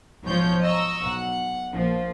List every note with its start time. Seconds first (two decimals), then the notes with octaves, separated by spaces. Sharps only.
0.25 B1 G#2 F3 C#5 G6
0.63 D#5 A#5 C#6 E6
1.03 B1 F#5
1.72 A#1 F3